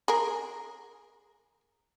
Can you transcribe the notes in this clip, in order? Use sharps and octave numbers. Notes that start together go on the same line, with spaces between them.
G#4 A#4